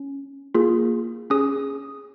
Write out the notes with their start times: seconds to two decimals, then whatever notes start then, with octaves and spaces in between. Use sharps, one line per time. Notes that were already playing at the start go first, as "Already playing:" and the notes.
Already playing: C#4
0.55 A#3 F4 G#4
1.30 C#4 G#4 D#6